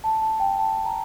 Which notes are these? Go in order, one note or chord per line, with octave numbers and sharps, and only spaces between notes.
A5
A5
G5
A5
A#5